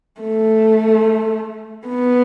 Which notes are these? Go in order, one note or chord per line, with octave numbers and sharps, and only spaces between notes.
A3
B3